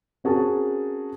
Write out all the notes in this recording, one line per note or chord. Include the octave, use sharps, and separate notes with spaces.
C4 C#4 F#4 G#4 A#4 A5